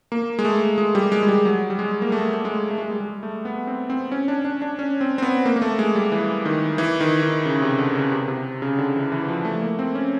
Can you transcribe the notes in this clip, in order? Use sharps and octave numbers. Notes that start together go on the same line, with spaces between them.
A#3
G#3
A3
G#3
G3
G#3
G#3
G3
F#3
G3
G#3
A#3
A3
A3
G#3
A3
G#3
G3
G#3
A3
B3
C4
C4
C#4
D4
D4
D4
C#4
C4
C4
B3
A#3
A#3
A3
G#3
G3
E3
D#3
E3
D#3
D#3
C#3
C3
D3
C#3
C3
C3
C#3
D3
E3
E3
F3
A3
A#3
C4
C#4